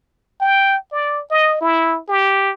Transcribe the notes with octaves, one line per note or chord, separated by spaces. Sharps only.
G5
D5
D#5
E4
G4